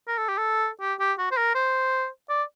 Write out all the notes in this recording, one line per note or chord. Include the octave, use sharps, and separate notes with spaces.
A#4
A4
G4
A4
G4
G4
F#4
C5
A#4
C5
D5